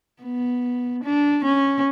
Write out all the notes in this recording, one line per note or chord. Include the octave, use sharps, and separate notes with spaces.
B3
D4
C#4